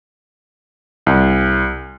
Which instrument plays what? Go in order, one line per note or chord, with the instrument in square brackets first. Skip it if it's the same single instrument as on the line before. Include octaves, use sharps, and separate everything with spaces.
[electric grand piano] C2